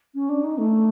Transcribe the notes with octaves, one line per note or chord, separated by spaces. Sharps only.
C#4
D4
D#4
A3